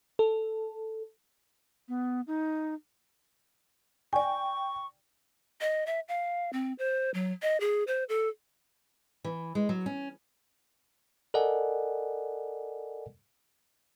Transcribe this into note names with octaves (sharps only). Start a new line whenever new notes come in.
A4
B3
D#4
D5 G5 G#5 C#6
D#5
E5
F5
C4
C5
F#3
D#5
G#4
C5
A4
E3
G#3
F#3
C#4
A4 A#4 D5 D#5 F#5 G#5